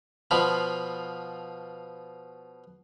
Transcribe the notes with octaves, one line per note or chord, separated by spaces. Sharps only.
B2 F3 F4 B5